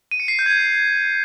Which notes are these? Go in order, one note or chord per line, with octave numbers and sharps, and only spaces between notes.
D#7
C#7
C7
G6
G#6